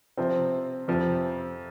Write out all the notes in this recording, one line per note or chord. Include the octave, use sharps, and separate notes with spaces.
C3 F3 C4
F2 C3 F3